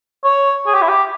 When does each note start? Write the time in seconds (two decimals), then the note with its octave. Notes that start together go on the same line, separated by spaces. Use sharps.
0.24 C#5
0.66 G#4
0.74 G4
0.81 E4
0.88 G4